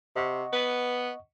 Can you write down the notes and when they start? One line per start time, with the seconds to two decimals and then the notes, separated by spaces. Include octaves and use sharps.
0.16 C3 D#5 F#5 C#6
0.53 B3 B4